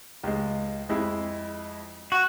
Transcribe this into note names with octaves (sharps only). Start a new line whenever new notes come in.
C#2 G#3
F2 G#3 E4
F#4